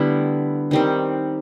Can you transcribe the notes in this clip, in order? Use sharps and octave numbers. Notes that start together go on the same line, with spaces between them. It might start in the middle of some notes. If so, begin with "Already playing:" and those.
Already playing: D3 G3 A3 B3 E4
D#3 G3 C4